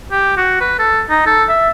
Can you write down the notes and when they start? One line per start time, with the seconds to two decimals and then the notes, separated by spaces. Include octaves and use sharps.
0.11 G4
0.37 F#4
0.61 B4
0.79 A4
1.10 D#4
1.26 A4
1.49 E5